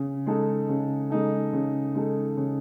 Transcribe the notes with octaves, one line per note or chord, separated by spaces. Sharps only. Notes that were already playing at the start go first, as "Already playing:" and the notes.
Already playing: C#3
G#3 D#4 A4
C#3
G#3 D#4 A4
C#3
G#3 D#4 A4
C#3